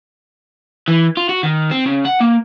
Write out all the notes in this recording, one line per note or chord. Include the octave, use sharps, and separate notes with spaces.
E3
F4
F#4
D#3
C4
C#3
F#5
A#3